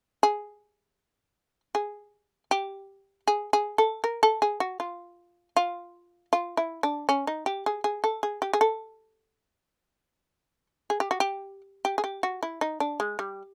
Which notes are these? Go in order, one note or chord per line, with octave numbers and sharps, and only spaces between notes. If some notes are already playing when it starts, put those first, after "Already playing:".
G#4
G#4
G4
G#4
G#4
A4
A#4
A4
G#4
F#4
F4
F4
F4
E4
D4
C#4
D#4
G4
G#4
G#4
A4
G#4
G4
G#4
A4
G#4
G4
F#4
G4
G4
G#4
G4
F#4
E4
D#4
D4
G#3
G3